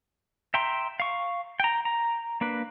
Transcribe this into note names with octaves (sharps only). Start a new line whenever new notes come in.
E5 G5 A#5 C6
F5 C#6
G5 A#5
A#5
A#3 D4 B4